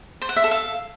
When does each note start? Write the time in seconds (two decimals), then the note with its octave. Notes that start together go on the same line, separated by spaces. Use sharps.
0.22 C5
0.29 F#5
0.36 E5
0.44 A4
0.51 F5